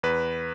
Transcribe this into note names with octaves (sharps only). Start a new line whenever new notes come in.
E2 B4